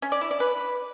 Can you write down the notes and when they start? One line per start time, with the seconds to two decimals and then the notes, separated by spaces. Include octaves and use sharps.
0.02 C#4
0.12 D5
0.21 E4
0.31 D5
0.40 B4